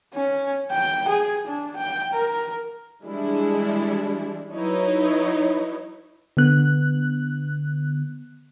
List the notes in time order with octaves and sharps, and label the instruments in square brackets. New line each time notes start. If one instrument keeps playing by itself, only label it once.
[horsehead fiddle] C#4
G5
G#4
D4
G5
A#4
[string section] E3 G3 G#3 D4 E4
F#3 D#4 E4 B4 C#5
[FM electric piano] D3 B3 F#6